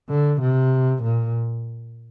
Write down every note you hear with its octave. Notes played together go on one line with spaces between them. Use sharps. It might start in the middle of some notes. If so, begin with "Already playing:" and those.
D3
C3
A#2